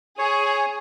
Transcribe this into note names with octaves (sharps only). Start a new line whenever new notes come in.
G#4 C#5